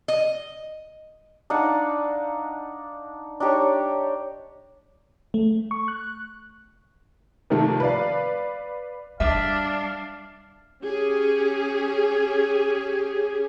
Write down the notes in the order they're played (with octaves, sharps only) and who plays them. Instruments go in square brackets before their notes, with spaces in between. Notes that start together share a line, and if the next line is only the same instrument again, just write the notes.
[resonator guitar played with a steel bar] D#5
[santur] D4 D#4 F5 F#5
D4 D#4 G4 C#5
[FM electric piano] A3
C#6
F#6
[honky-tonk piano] C3 D#3 F3 A3 A#3
B4 D5 F5
[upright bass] G3 [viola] D4 [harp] E5 [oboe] F5
[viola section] C#4 G4 G#4